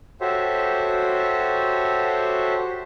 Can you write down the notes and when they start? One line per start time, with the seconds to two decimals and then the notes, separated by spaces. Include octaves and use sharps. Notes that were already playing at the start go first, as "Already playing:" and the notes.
0.21 F#4 G4 A4 C5 C#5 E5